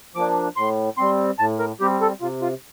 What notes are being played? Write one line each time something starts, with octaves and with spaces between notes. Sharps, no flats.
F3 A#3 D4 D6
A2 C6
G3 C4 C6
A2 A5
A#4
G3 C4 G4
A4
C3 F4
F4